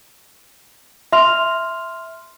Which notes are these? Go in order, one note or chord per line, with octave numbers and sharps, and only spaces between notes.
E5 C6 F6 F7